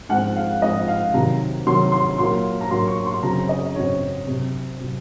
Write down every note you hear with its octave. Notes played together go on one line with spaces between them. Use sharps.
G#2 F3 C4 F#5
F5
G#2 F3 C4 D#5
F5
C3 D#3 F#3 A#5
C3 D#3 F#3 C6
C6
A#2 F#3 A#3 C6
A#5
A#2 F#3 A#3 C6
C#6
C6
F#2 C#3 F#3 C4 A#5
D#5
F#2 C#3 F#3 C4 C#5
C3 F#3 C4
C3 F#3 C4